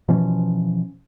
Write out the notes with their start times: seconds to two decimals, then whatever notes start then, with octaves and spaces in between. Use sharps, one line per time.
0.08 B2 E3 F3 C#4